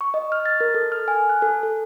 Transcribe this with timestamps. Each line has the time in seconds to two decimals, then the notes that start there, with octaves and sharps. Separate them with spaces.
0.01 C#6
0.14 D#5
0.32 F6
0.46 A6
0.60 A#4
0.74 A4
0.92 F6
1.08 G#5
1.30 F#6
1.42 A4
1.63 A4